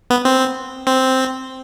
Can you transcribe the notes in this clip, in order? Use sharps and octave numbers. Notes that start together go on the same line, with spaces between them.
B3
C4
C4